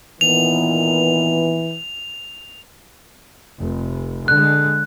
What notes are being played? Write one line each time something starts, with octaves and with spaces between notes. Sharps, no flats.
A#2 D#3 E3 B3 F7
F1
D3 G#3 F#6